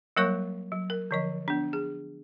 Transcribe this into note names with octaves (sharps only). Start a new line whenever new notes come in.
F#3 G3 A#3 A#4 C#5 C#6
F#3
A#4
D3 F3 D#5
B3 D4
G#4